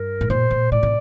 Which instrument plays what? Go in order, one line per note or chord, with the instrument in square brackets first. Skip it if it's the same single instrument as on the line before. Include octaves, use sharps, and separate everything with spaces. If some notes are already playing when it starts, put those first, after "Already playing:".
Already playing: [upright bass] G2 [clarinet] A#4
[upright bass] A2
[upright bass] A#2 [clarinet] C5
[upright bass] A#2
[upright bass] A2 [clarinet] D5
[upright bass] C3